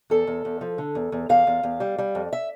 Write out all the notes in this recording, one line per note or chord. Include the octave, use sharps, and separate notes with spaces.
E2 A4
E2
E2
F3
D3
E2
E2
E2 F5
E2
E2
G3
G3
F2
E5